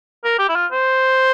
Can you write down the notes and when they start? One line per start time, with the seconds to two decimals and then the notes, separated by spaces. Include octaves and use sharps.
0.24 A#4
0.39 G4
0.49 E4
0.55 F4
0.72 C5